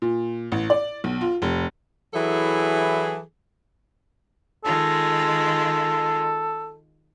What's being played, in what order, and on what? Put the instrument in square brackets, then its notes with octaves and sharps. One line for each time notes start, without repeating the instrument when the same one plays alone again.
[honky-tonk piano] A#2
A1
D5
B1
F4
F1
[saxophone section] E3 F#3 E4 G#4 A4
[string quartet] D#3 G#3 F4 [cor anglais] A4